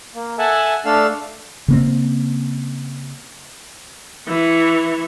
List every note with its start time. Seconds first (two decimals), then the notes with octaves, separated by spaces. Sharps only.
0.15 A#3
0.38 A4 E5 F#5 G#5 A5
0.85 A3 D4 A4 F5 E6
1.68 C#3 A#3 C4
4.28 E3 C#6